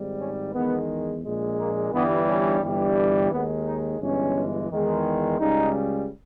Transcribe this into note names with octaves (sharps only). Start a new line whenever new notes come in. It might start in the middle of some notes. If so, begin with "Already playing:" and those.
Already playing: G#1 G#2 G3
C#4
E2 D#3 G#3 B3
A#1 A#2 G#3
A#3
G1 G2 E3 G3 B3
C#4
G1 G2 E3 G3
D#2 D#3 G#3 B3
D#4
G1 G2 E3 G#3 C#4
E2 D#3 G#3
C#2 C#3 G3 D#4